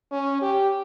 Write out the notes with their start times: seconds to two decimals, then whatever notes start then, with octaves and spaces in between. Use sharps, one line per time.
0.12 C#4
0.41 G4